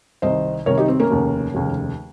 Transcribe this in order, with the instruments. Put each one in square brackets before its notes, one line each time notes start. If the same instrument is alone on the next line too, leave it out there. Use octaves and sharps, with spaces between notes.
[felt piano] C2 C3 D#3 C5 D#5
C2 C3 D#3 A#4 C#5
D#4 G4
C4
A#3 C#4
F1 D#2 C#3
F1 D#2 C#3